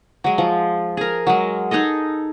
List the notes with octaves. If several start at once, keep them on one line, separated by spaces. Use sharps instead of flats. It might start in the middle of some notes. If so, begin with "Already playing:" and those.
F#3 G#3
F3
G#4 A#4
F#3 G#3
D#4 G#4 A4 D#5